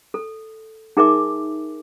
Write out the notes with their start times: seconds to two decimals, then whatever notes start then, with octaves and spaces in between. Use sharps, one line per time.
0.14 A4
0.97 D#4 G#4 A#4 E5 G#5 D6